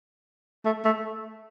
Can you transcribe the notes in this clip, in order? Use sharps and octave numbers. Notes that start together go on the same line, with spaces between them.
A3
A3